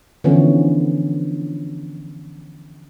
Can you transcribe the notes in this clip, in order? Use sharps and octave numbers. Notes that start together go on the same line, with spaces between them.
D3 E3 F3 B3 C#4